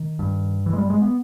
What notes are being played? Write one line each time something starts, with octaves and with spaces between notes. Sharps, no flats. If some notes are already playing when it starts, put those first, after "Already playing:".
Already playing: D#3
G2
E3
G#3
G3
G#3
B3